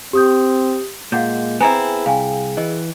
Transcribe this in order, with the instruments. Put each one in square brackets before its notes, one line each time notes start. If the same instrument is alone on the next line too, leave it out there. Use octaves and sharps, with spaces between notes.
[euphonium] C4 [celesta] G4 D#6 G6
[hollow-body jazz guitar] A#2 [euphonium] G#3 [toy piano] F5 F#5 D6 [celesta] G6
[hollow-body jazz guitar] B3 C4 E4 [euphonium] G#4 [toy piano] G#5 A#5
[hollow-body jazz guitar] C2 [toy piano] F5 G5 G#5
[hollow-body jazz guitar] E3 [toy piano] D#5